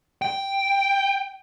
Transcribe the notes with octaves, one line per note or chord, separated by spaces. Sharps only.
G5